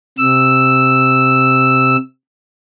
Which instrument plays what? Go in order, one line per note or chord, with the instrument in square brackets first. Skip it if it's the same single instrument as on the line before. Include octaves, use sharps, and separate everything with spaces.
[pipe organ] C3 E6